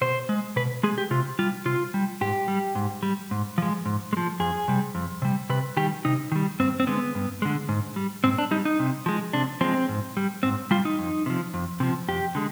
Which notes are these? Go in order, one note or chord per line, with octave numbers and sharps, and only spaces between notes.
B2 C5
G#3
B2 B4
G#3 G#4
G4
C3 F4
G3 F4
C3 F4
G3
G#2 G4
G3
G#2
G3
G#2
F3 G#3
G#2
G#3
F3
F2 G#4
C3 G3
F2
C3 G3
C3 B4
D#3 G3 G4
C3 D#4
D#3 G3
G2 C4
C4
D3 G#3 B3
G2
D3 G#3
G#2
G3
G#2 C4
D4
G3 D#4
D#4
C3
F3 G#3
C3 D4
F3 G#3 C4
G#2
G3
G#2 C4
G3 F4
D#4
F2
C3 F3
F2
C3 F3
F2 G4
D3 G#3